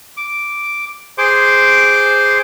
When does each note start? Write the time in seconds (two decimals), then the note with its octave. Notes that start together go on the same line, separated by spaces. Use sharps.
0.17 D6
1.18 G#4 C5 C6 D6